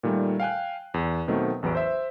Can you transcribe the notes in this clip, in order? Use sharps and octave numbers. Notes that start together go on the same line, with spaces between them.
A#2 D#3 G3 A3
F5 G5 G#5 F#6
E2
B2 D#3 F#3 A3 B3 C4
A1 E2 F#3 B4 D7
C5 E5 E6